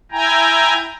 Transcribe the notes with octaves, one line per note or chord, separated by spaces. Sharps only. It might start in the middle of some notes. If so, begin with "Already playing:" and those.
E4 G5 G#5 A#5